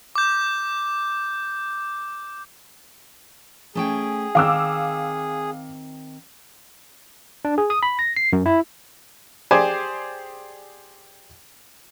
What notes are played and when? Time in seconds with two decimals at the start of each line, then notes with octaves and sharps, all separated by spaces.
0.15 D6 G6
3.75 A3 C#4 G#4 G5
4.35 D#3 C4 F5 D6 E6
7.45 D4
7.58 G#4
7.70 D#6
7.83 B5
7.99 A#6
8.16 C7
8.33 F#2
8.46 E4
9.51 G4 G#4 C5 D5 G#5